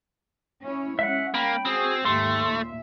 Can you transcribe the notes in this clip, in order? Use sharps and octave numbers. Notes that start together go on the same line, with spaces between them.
C#4 E4 C#5
G#3 C#4 E5 F#5
A#3 G5 B5
C4 F#4 G#4
D#2 G#2 A3 G4 C6
A#2 E5